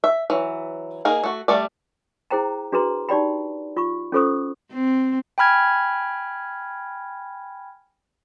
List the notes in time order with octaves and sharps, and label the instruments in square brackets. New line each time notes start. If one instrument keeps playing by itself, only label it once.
[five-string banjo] E5
E3 F#3
A#3 D#4 G#4 A#4
A3 F#4
G3 A3 D5
[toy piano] E4 G#4 C5 G5 A#5
D4 F#4 G#4 B4 A#5 C6
D#4 G4 D5 G5 B5
F4 C#6
C#4 F4 A4 C5 C#6 D#6
[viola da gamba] C4
[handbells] G5 G#5 B5 F6 G#6